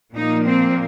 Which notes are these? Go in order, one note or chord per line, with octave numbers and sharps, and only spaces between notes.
A#2 F3 A#3 D#4
C4